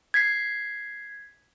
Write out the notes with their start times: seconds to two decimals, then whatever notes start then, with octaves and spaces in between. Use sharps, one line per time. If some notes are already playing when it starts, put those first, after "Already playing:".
0.14 G#6 B6 C7